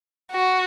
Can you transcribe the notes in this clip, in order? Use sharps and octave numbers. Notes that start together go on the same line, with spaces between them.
F#4